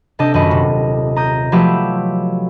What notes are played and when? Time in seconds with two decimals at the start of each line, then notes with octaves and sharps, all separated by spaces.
0.19 C3 D4 A4 D#5 A5 G6
0.34 D#1 F#2 B4 D#5 C#6
0.51 C3
1.16 A#5 D#6 G6
1.52 F3 F#3 A3 G4 B4 E5